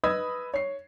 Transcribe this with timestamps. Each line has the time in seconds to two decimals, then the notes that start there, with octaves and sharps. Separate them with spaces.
0.04 B4 D#5 B5 D#6 E6 G#6
0.54 C#5 C7